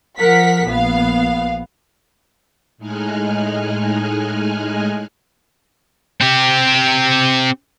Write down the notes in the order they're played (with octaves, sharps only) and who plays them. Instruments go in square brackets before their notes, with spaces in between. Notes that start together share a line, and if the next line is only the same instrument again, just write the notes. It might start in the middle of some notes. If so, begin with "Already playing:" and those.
[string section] F3 A#4 F#5 B6
A#1 B3 F5
[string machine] A2 G#3 D#4 G#5 F6 F#6
[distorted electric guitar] C4 G4